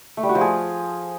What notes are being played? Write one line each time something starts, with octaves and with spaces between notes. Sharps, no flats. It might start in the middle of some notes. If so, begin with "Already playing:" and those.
A3
G3
F#4
F3
G#4